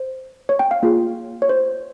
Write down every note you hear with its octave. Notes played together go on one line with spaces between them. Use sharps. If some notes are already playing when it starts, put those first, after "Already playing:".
Already playing: C5
C#5
G5
F5
A#3 F4 G#4
C#5
C5